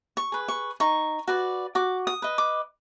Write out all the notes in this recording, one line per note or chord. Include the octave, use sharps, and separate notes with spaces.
C#6
G#4 B4
C#6
D#4 C#6
F#4 B4 D5
F#4 D6
D#6
B4 D#5
D6